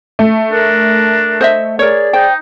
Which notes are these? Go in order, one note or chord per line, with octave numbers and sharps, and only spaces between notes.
A3
D4 A#4
C5 D#5 E5
G#4 A#4 C#5 D5
D#4 C5 G5